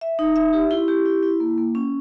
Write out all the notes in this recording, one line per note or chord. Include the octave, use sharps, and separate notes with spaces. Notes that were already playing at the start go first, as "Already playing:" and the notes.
E5
D#4
E5
G4
E4
G4
E4
E4
A#3
A#3
C#4